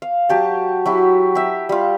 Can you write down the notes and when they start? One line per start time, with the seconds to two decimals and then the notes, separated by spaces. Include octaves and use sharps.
0.02 F5
0.29 F#3 G4 A5
0.86 F#3 E4 G4
1.35 G4 E5
1.69 G3 F4